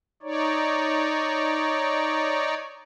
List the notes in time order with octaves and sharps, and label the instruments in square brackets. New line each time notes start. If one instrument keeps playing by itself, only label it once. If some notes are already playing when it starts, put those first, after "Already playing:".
[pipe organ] D#4 C#5 D5